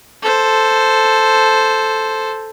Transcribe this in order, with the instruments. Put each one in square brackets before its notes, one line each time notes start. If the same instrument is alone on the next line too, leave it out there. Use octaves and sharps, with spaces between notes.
[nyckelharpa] A4 C5